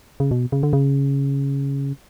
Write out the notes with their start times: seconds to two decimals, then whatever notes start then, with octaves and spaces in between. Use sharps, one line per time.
0.20 C#3
0.31 B2
0.52 C#3
0.63 D3
0.73 C#3